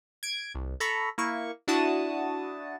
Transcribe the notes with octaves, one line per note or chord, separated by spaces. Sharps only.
G#6 D7
C2
A4 A#5 B5 C#6
A#3 E4 C#6
D4 E4 F#4 A5 D#6